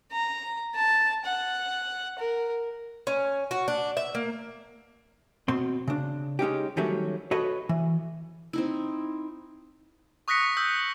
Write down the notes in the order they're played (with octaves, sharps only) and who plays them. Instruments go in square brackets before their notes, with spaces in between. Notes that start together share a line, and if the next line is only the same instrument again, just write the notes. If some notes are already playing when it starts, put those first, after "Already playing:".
[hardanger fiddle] A#5
A5
F#5
A#4
[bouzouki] C#4
F#4
D4
E5
A#3
[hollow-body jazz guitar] B2 C4 C6
C#3 D4
G#3 C#4 D#4 G4
D#3 F#3 G3 A3 C#4
F#4 A4 B4 C#5 D#5
E3
[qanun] C4 D#4 E4
[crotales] C#6 D#6 F#6 A#6 B6 C#7
D#6 E6 G6 B6